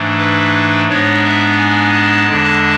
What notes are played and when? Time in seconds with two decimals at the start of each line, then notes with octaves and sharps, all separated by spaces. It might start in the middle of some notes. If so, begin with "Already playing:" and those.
Already playing: G#2 E3 A3 D4
0.18 B4
0.88 G#2 G#3 B3 D4 C#5
1.24 E5
1.58 G#5
1.93 A5
2.29 E2 D3 G#3 D4